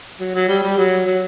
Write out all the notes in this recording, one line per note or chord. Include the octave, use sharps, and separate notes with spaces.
F#3
F#3
G3
G3
F#3
F#3